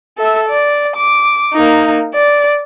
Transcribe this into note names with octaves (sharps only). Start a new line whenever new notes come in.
A4 E5
D5
D6
A#3 D#4
D5